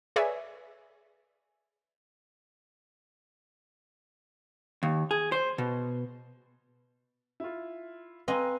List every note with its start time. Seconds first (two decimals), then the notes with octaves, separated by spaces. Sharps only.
0.16 G#4 B4 C#5 D5 E5 G#5
4.83 D#2
5.11 G#4
5.32 C5
5.58 B2
7.40 E4 F4
8.28 C4 B4 D#5 F5 G#5 A#5